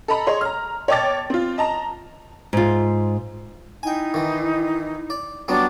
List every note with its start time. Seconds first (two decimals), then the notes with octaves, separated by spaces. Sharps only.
0.08 A4 D#5 A#5 B5
0.27 G#4 C#5 D#5 C6
0.41 A#5 F6
0.88 C#5 D#5 G5 A5 D6 A6
1.30 C4 F4
1.58 D#5 A5 A#5
2.53 G#2 F4
3.83 D#4 E4 G5 G#5
4.14 D#3 E3
5.10 D5
5.48 F#3 G3 B3 D4 C#5 D6